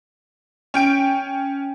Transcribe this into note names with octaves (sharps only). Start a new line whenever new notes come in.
C#4 G5 D7